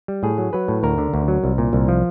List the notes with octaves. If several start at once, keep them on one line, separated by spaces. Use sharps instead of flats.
G3
A2 G#4
F#3
F#3 B4
A2
D2 A#4
D3
D2
F#3
C2
A#2
C2
F3